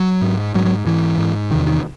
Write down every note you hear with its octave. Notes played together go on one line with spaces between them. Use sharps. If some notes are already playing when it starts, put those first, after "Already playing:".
Already playing: F#3
G#2
G#2 F#3
F#3
G#2 E3
G#2
E2 C3 D#3
D#3